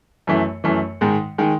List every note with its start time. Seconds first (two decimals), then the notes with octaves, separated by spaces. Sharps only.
0.27 F#2 E3 A3
0.64 F#2 E3 A3
1.01 G#2 D#3 G#3
1.38 D#3 G#3